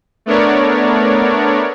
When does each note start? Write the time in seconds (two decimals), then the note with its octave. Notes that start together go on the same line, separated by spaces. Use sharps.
0.26 A3 B3 D4 A#4 C#5 D5